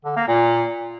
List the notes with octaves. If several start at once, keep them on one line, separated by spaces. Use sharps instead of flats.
D3
A#3
A#2